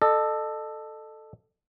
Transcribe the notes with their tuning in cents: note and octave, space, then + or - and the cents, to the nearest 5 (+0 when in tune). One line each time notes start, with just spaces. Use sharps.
A4 +0 D#5 -35